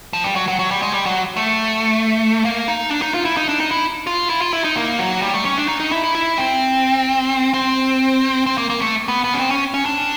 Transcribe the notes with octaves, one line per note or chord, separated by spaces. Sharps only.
F3
G3
F#3
F#3
F#3
G3
G#3
G3
F#3
A3
A#3
D#4
D4
D#4
F4
E4
D#4
D4
D#4
E4
F4
E4
F4
E4
D#4
A#3
F#3
G3
A3
C#4
D4
D#4
D#4
E4
E4
E4
C4
C4
C4
A#3
A#3
A3
B3
B3
C#4
C4
C#4
C#4
D4